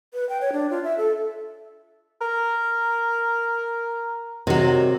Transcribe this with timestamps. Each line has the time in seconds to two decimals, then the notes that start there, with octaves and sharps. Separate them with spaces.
0.14 B4
0.29 G5
0.41 C#5
0.53 D4
0.70 F4
0.84 E5
0.98 A4
2.21 A#4
4.47 C3 D#3 F#3